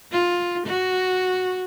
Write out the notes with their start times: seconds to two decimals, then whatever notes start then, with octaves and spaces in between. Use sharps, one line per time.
0.12 F4
0.67 F#4